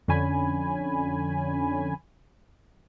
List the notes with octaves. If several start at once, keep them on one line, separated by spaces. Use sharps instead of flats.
F2 D3 C#4 G#5 B5